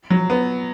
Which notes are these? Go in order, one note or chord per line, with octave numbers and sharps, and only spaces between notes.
F#3
B3